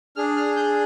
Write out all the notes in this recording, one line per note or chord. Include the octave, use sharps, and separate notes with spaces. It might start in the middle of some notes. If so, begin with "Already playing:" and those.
D4 G#4 F6
F6
G6